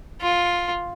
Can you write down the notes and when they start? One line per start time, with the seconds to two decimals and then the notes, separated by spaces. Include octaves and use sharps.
0.21 F4